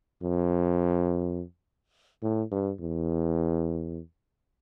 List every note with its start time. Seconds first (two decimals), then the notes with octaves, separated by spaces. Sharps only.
0.23 F2
2.23 A2
2.52 G2
2.80 E2